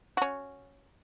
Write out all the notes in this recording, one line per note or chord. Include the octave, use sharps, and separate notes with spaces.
C#4 F#4